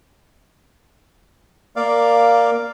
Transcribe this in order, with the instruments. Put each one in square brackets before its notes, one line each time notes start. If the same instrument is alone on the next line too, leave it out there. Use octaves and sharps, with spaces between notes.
[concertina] A#3 D5 F5